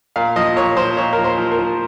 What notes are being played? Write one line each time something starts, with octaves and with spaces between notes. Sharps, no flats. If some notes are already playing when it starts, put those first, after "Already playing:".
A#2 F5
F3 D#5
A#2 C#5
F3 C5
A#2 C#5
F3 A#4
C5
F3
A#4
F3